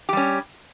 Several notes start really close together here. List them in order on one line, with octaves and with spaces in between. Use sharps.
G4 G3 C#4